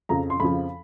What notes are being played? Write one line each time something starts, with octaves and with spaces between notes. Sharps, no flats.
F2 C#3 F3 A#5
C6
F2 C#3 F3 B5